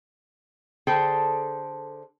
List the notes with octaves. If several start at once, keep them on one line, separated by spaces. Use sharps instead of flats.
D3 G#4 A4 C5 G5